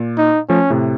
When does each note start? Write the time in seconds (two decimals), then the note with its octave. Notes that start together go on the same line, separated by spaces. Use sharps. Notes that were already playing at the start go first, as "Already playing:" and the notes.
Already playing: A#2
0.18 D#4
0.49 F3 A3 C#4
0.70 A2 C3